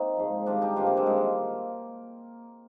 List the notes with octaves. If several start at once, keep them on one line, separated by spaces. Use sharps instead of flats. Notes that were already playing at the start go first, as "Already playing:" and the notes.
Already playing: A#3 C4 D#4
G#2 F3
C3 D#3 G3 D4 F4
D#4 G4
G2 D3 F3 D4 F4
A#3
G#3 C4
C3 D#3 G3 G#3
A#3